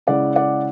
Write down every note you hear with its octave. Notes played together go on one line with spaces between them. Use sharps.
C#3 G#3 C#4 E4 D5 F#5
D5 F#5